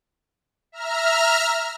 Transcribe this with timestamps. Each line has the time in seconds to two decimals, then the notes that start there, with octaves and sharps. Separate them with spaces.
0.72 E5 A#5 F6